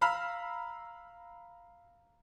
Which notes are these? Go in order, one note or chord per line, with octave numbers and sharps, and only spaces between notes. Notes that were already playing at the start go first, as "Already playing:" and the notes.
F5 A#5 B5 E6 F6